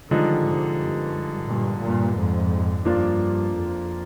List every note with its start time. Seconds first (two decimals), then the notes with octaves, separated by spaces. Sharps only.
0.10 D3 D#3 F3 G3 G#3 D#4
0.45 G#2 C3
0.79 G2
1.48 G2 A#2
1.82 G2 A#2
2.17 F2 G#2
2.85 G2 F3 A#3 D4 F4
3.55 F2